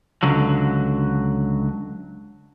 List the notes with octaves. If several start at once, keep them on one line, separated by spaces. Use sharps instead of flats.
C#2 D3 F#3